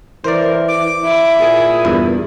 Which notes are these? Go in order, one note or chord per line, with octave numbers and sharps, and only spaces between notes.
E3 A#4 C5 D5
D6
E4
A#2 G#4
E2 G2 E4